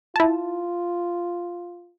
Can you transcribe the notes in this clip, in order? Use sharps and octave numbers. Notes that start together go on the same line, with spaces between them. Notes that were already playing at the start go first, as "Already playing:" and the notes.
E4 F4 A5